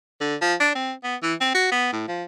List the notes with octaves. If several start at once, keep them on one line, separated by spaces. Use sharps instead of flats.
D3
F3
D4
C4
B3
E3
C4
F#4
B3
A2
F3